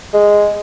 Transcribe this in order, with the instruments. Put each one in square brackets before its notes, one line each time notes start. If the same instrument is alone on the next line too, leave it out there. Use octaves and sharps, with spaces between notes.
[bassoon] G#3